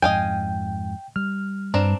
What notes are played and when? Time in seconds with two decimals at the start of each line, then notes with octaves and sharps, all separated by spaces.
0.02 F2 G#2 D#5 F5 G5 G#5
1.16 G3 F6
1.74 G2 C4 D4 A#5